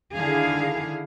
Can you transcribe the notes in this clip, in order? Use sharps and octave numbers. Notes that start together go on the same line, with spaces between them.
D3 D#3 E4 G#4 F5